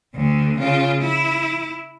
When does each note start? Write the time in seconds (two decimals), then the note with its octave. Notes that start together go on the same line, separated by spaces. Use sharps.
0.15 D2 D3
0.58 C#3 F4
1.01 E4